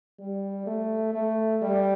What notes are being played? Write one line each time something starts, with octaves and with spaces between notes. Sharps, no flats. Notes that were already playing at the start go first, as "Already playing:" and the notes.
G3
A3
A3
G3